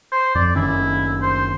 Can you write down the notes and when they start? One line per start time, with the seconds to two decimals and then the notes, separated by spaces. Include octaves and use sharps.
0.12 C5
0.35 F2 D5
0.56 F#1 D#3 C#4 E4
1.22 C5